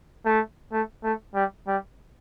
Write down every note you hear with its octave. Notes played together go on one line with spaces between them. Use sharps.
A3
A3
A3
G3
G3